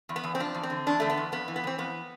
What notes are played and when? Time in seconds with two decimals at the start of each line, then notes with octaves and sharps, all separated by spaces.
0.09 E2
0.16 B3
0.24 E2
0.35 C4
0.40 F3 D4
0.54 E2
0.63 C4
0.70 D3
0.87 E2 D4
1.00 D3 A3
1.10 B3
1.17 E2
1.32 F2 B3
1.48 E3
1.56 B3
1.64 E3 C4
1.78 F2 B3